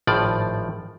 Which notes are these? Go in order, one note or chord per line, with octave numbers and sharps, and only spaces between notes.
G#1 A2 F3 D5